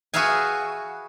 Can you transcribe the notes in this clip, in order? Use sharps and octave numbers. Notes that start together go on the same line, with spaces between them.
F#4 G#4 B4 E5 F5 G#5